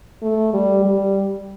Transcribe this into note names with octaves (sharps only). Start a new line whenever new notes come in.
A3
G3
G3